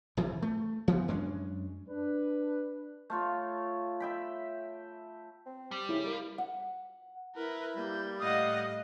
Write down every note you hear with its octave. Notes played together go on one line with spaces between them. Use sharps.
D#1 C2 F2 E3
A3
E3 F3 B3
F#2 G#3 C#4 D4
D4 B4
A3 F4 C#5
E5 G5 B5
C4
G3
C#3 E4
A#3
F#5
E4 A#4 B4
G3 A#3 G6
A2 D#5 F5 F#5 D#6